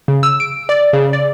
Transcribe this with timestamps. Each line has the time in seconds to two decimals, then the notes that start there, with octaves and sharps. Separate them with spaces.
0.08 C#3
0.23 E6
0.40 D7
0.69 D5
0.93 C#3
1.13 D5